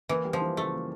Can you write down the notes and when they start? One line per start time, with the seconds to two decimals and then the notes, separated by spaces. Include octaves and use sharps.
0.09 E3 A#3
0.25 G3
0.33 F3
0.41 E3
0.57 C#3 A3
0.73 A#3